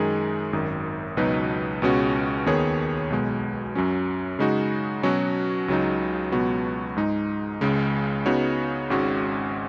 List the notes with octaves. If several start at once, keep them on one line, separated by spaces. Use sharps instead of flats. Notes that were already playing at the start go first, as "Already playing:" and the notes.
Already playing: F#2 D#3 G#3 D#4 G#4
G#1 F#2 D#3
C#2 B2 F#3 D#4 B4
C#2 B2 G#3 C#4 F#4
D#2 D#3 B3 G#4 C#5
B1 B2 G#3
F#2 F#3 C#4
C#3 G#3 D#4 F#4
B2 F#3 C#4 F#4
C#2 C#3 F#3 D#4
C#2 B2 F#3 B3 F#4
G#2 G#3 D#4
C#2 C#3 G#3
C#3 B3 D#4 F#4 C#5
G#1 G#2 G#3 C#4 F#4